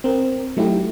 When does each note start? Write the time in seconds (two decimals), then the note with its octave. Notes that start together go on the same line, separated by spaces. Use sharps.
0.04 C4 A#4
0.57 F#3 A3 D#4 E4 F#4 G4